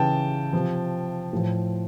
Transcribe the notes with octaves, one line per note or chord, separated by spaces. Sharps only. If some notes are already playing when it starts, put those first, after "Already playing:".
Already playing: C#3 E3 G5 A5
C3 F3
A2 F3